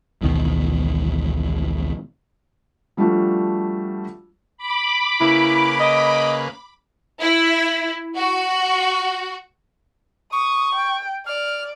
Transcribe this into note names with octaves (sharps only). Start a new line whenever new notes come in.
A1 D2 B2 D#3
F3 G3 A3 D4 F4 F#4
B5 D6
C#3 A#3 E4 B4
D#5
E4
F#4
C#6 D#6
G5
D5 F6